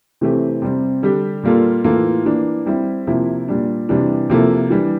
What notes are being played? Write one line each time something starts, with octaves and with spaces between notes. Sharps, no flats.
C3 E3 A3 C4 G4
C3 G3 C4
D3 G3 D4 G4
A#2 G3 A#3 F4 A4
A2 E3 A#3 F4 A4
E3 A#3 D4
G3 C4 E4 G4
C3 F3 A#3 E4
A#2 G3 D4
C3 E3 G3 D4
C3 F3 A#3 E4 A4
E3 G3 D4 G4